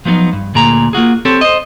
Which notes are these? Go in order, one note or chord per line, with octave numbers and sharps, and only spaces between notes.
F3 F#3 B3 C#4 D#4
G2
D2 A#2 G#4 A#5
A#3 F4 F#4 G#4
C4 G4 A4 C#5
C5 D#5